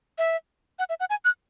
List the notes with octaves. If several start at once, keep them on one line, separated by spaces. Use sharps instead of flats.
E5
F#5
E5
F#5
G#5
F#6